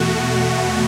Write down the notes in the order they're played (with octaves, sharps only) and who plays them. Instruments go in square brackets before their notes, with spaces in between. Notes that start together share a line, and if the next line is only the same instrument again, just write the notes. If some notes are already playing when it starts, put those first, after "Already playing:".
Already playing: [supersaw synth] E2 B2 A3 F#4